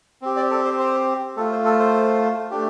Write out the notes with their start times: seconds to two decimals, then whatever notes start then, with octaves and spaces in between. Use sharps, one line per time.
0.22 C4 G4
0.36 D5
0.51 A4
0.65 C5
0.79 C5
1.37 A3 F4 A4
1.51 C5
1.65 A4
1.79 C5
2.51 A3 D4 G4